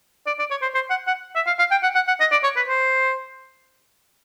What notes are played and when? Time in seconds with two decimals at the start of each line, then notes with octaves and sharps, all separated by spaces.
0.27 D5
0.39 D5
0.51 C#5
0.62 C5
0.75 C5
0.90 F#5
1.07 F#5
1.36 E5
1.47 F5
1.59 F5
1.71 G5
1.83 F#5
1.95 F#5
2.08 F#5
2.20 D#5
2.32 D5
2.44 C#5
2.57 B4
2.68 C5